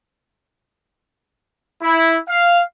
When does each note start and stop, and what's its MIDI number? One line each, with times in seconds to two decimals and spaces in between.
1.81 2.18 64
2.29 2.61 77